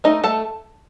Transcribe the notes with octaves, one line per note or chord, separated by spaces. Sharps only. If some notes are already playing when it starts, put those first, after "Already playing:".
A3 D#4 D#5
A3 A4 A5